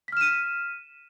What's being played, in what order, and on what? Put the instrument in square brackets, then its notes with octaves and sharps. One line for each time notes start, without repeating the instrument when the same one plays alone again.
[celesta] B6
F6
E7
D#7